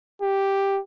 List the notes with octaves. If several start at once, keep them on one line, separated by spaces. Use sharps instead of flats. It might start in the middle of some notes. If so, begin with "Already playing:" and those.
G4